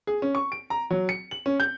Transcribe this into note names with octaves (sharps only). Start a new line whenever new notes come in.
G#4
C#4
C#6
D7
A#5
F#3
C#7
F#7
C#4
G6